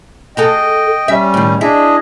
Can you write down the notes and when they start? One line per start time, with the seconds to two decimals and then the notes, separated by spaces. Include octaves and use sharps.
0.37 F#4 G#4 A4 D#5 G5
1.08 G3 C#4 E5
1.34 A2 D#3
1.61 D4 E4 G#4 D#5